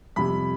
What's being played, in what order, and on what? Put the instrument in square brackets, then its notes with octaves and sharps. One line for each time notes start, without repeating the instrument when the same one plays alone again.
[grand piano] F2 C3 G3 B5